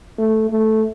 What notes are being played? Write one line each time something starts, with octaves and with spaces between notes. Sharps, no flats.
A3
A3